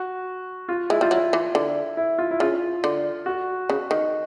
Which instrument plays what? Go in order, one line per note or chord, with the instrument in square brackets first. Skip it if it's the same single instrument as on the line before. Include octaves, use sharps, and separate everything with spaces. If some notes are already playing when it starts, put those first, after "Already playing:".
Already playing: [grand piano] F#4
F4
[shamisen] G#3 [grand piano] E4
[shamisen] G3 [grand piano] F4
[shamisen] F#3
[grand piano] E4
[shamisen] E3
D3
[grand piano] E4
F4
E4
[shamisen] C#3 [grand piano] F4
[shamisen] D3
[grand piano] F#4
[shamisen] C#3
D#3